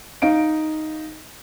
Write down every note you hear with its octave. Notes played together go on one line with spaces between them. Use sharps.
D#4 F5 D7